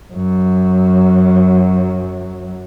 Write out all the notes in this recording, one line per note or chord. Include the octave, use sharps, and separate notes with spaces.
F#2 F#3